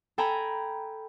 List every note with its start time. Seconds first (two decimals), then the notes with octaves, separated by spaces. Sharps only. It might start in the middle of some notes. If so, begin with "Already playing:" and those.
0.18 A4 G5 G#5 A#5 B5